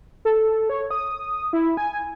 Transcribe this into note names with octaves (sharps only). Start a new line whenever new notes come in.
A4
C#5
D#6
E4
G#5